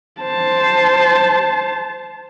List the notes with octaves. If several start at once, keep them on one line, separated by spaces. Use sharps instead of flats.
C5 A5